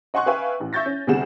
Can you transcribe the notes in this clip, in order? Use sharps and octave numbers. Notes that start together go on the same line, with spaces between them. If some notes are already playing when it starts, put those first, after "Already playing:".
D#5 F#5 G#5 C6 C#6 F#6
B4 E5 F5 G5 G#5 C#6
A1
E5 C#6 G6 A6 A#6
C#4
D2 C3 G3 G#4 F#5 E7